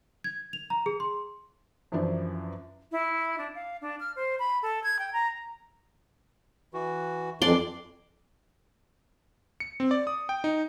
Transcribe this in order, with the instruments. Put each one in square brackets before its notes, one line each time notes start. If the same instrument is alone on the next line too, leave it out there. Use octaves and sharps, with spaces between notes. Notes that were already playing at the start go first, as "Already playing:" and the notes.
[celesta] G#6
F7
A#5
G#4
C6
[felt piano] F#2 E3 F3 D4
[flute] E4
D4
F5
D4
F6
C5
B5
A4
G#6
G5
A#5
[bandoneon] E3 F#4
[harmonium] F2 [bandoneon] E3 D4 [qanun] D5 C6
[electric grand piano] C#7
C4
D5
D#6
G5
D#4